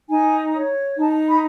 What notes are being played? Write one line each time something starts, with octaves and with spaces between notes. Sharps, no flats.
D#4 G#5
C#5
D#4 A5
B5